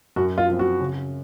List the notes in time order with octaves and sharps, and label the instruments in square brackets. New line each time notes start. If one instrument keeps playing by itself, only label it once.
[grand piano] F#2 [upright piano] F#4
[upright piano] F4
[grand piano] F3 C4
[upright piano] F#4
[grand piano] C#3